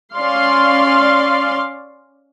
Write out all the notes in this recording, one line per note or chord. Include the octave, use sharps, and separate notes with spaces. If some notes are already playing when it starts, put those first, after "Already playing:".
C#4 D5 F5 C6